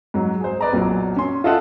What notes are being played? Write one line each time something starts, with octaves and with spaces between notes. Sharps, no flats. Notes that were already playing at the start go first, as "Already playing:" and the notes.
G#2 F#3
G#4 C5
B4 D5 A#5
B1 A#2 F#3
C#4 C6
F4 A4 D#5 E5 F#5